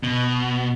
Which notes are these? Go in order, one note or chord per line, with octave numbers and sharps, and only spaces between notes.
B2